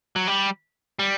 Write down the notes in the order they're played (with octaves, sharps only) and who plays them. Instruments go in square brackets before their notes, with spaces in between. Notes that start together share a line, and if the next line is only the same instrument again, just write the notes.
[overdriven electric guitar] F#3
G3
G3